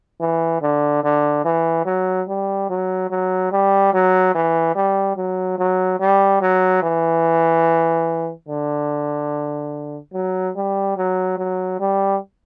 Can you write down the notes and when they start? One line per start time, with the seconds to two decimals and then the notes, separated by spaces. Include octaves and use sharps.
0.21 E3
0.62 D3
1.04 D3
1.45 E3
1.86 F#3
2.28 G3
2.70 F#3
3.10 F#3
3.52 G3
3.94 F#3
4.35 E3
4.75 G3
5.17 F#3
5.58 F#3
6.00 G3
6.41 F#3
6.83 E3
8.49 D3
10.13 F#3
10.56 G3
10.97 F#3
11.38 F#3
11.80 G3